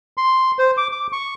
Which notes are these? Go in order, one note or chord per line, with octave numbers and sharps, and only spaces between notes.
C6
C5
D6
D6
C#6